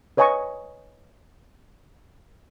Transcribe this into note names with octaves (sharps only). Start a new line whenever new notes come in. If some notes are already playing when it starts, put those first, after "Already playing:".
B4 C#5 D#5 G#5 B5 C#6